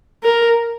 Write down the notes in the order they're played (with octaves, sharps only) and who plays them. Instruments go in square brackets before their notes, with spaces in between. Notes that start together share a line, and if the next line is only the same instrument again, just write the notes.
[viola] A#4